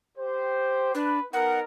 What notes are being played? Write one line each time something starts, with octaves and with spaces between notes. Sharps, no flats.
G4 C5
D4 B4
B3 D#4 A#4 F#5